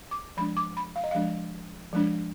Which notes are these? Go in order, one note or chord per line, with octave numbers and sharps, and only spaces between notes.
D6
F3 G#3 D4 B5
D6
B5
F5
D#5
F3 G#3 D4 F5
F3 G#3 D4